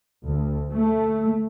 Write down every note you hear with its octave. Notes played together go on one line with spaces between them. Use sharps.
D2
A3